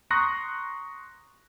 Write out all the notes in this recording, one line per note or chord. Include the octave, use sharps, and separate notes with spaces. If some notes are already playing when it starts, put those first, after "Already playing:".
A#5 C6 C#6 D#6 F#6 A#6